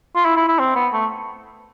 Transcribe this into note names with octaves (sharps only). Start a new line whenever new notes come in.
F4
E4
E4
E4
C4
B3
A3